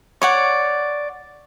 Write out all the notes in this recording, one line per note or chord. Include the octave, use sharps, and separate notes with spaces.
C#5 D5 F#5